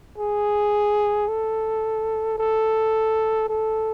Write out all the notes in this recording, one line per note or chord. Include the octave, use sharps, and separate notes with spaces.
G#4
A4
A4
A4